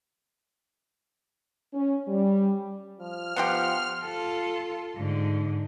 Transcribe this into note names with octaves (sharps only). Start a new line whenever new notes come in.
C#4
G3
F3 F6
F3 B3 F#4 G4 F#5 C6
F4 A4
G#2 D3